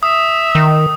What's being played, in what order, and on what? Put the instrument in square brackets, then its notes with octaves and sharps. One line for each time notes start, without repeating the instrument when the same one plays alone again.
[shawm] E5 [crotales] D#6
[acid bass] D#3